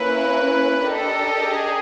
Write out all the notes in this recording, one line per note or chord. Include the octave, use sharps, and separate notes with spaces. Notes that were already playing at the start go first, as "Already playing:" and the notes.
Already playing: A#3 C#4 E4 B4
D4 G4 A4 A#4 D#5
G#4